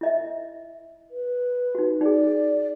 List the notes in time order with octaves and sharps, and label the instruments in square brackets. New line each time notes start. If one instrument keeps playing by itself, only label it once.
[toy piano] E4 D#5 E5
[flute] B4
[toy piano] D#4 F#4
[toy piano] D#4 G#4 [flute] D5